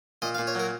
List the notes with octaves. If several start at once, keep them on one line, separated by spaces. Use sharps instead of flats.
A#2 D#5
F5
A#2
C#5
F#3 A#4